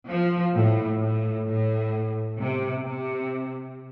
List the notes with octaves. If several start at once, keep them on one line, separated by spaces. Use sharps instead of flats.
F3
A2
A2
A2
C3
C3